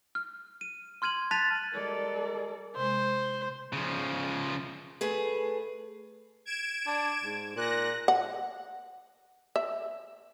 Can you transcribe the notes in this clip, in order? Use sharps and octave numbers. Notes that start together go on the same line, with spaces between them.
F6
D#7
C6 F6 G#6 D#7 F#7
A5 F#6 A6 B6 D#7 F7
G3 G#3 A4 A#4 D5
C3 G#3 C5
C#3 F3
A3 G#4 B4
G#6 D7 E7
D4
G#2
A#2 F#6 A#6
F#5
E5